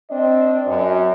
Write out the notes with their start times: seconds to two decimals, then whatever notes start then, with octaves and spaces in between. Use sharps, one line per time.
0.11 C4 D4 D#5
0.67 F#2